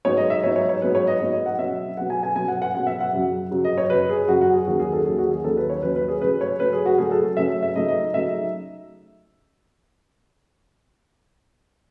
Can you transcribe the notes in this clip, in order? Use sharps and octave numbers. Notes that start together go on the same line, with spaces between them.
G#2 F#3 B3 D#4 C#5
D#5
E5
G#2 F#3 B3 D#4 C#5
C#5
C#5
G#2 F#3 B3 D#4 B4
C#5
D#5
G#2 F#3 B3 D#4 C#5
D#5
F#5
B2 F#3 C#4 E5
B2 F#3 C#4 F#5
G#5
G#5
B2 F#3 C#4 G#5
F#5
F#5
B2 F#3 C#4 F#5
E5
F#5
F#2 C#3 F#3
F#2 C#3 F#3
D#5
C#5
F#2 C#3 F#3 B4
G#4
F#2 C#3 F#3 F#4
F#4
G#4
D#2 D#3 F#3 C#4 F#4
G#4
A4
D#2 D#3 F#3 C#4 G#4
F#4
G#4
D#2 D#3 F#3 C#4 A4
B4
C#5
D#2 D#3 F#3 C#4 B4
B4
G#4
C#3 F#3 A3 C#4 B4
C#5
C#3 F#3 A3 C#4 B4
G#4
F#4
C#3 F#3 A3 C#4 G#4
A4
C#3 F#3 A3 C#4 E5
E5
C#3 F#3 A3 D#4 D#5
D#5
C#3 F#3 A3 D#4 E5